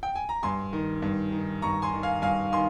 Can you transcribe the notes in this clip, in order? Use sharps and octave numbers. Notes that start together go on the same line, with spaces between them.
G5
G#5
A#5
G2 G#5 C6
D#3
G2
D#3
G2 A#5 C#6
G#5 C6
D#3
F5 G#5
G2 F5 G#5
D#3 G#5 C6